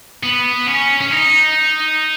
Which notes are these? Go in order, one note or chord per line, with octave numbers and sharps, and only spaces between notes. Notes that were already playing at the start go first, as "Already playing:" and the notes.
B3
C#4
C#4
D#4